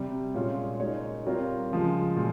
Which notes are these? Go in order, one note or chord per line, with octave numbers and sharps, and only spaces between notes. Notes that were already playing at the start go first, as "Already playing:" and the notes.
Already playing: C3 G3 C4
A#2 G#3 C#4 F4
G#3 D#4 A#4 C#5
G3 C4 F4 A#4 C#5
C#3 F3 G#3
A#2 F3 G#3